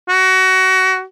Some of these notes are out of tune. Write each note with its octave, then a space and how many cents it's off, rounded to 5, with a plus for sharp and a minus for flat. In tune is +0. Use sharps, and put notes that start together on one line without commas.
F#4 +25